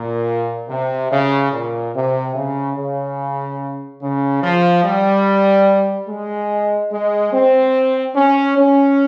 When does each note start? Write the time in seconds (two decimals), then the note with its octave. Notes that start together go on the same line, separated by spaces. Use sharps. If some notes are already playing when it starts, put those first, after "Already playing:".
Already playing: A#2
0.69 C3
1.11 C#3
1.52 A#2
1.95 C3
2.35 C#3
2.76 C#3
4.02 C#3
4.43 F3
4.85 G3
6.09 G#3
6.92 G#3
7.33 C4
8.16 C#4
8.57 C#4